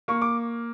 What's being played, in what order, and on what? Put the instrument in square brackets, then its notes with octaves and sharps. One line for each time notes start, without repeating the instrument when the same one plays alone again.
[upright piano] A#3 [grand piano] C#6
[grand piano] D6